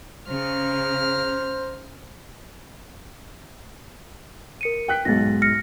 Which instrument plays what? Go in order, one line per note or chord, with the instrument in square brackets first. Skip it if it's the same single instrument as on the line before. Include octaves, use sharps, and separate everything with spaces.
[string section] C#3 [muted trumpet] C5 [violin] A#5 F6
[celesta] A#4 C#7 D#7
[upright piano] G5 F#6 B6
[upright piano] B1 G#2 [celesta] A6 A#6
[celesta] F6 A#6 C#7